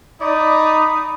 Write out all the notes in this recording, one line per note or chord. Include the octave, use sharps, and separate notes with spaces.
D#4 D5 B5 D#6